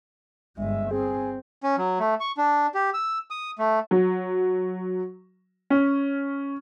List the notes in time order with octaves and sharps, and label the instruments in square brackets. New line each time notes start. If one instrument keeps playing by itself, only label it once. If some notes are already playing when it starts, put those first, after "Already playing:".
[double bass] G1 G#3 [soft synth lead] E5
[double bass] C4 [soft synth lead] G#4
[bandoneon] C#4
F#3
A3
C#6
D4
G4
E6
D#6
A3
[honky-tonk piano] F#3
C#4